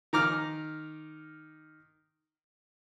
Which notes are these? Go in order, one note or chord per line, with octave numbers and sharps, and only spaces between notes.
D#3 A#5 D6 F6